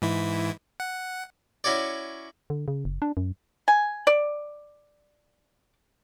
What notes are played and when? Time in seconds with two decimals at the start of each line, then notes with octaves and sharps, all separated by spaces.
0.02 G#2 E3 E4
0.80 F#5
1.64 C#4 E4 F#4 C#5 D5
2.50 D3
2.68 C#3
2.85 F#1
3.02 D4
3.17 F#2
3.68 G#5
4.07 D5